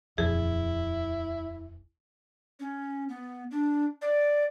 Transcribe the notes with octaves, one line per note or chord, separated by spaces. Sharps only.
D#1 F2 E4 G#4
C#4
B3
D4
D5